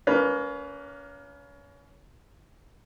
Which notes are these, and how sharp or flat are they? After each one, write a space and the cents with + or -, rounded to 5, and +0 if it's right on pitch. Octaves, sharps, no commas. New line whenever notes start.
A#3 +0 C#4 +30 B4 +0